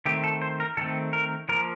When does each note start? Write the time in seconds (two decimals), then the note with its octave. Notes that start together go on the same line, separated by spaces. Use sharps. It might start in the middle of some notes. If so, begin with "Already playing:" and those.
0.06 D#3 A3 C4 G4
0.24 A4
0.42 C5
0.60 A#4
0.77 D#3 A3 C4 A4
1.13 A#4
1.49 F3 A#3 A#4